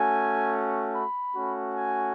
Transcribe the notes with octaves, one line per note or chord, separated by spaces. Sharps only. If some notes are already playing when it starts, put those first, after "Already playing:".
Already playing: A3 C#4 F#4 G#5
B5
A3 C#4 F#4
G#5